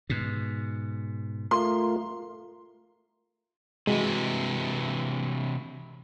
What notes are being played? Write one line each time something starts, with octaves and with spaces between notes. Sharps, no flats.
G#2 B2
A3 F4 A#4 C6
C3 E3 G#3 F#4